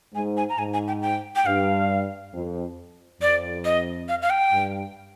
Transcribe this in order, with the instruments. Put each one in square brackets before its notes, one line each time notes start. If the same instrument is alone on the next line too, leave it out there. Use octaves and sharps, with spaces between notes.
[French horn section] G#2 [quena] G#5
[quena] G#5
A#5
[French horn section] G#2 [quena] G#5
[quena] G#5
G5
G5
G5
[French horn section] G2 [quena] F5
[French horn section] F2
[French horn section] F2 [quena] D5
[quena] D#5
F5
F5
G5
[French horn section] G2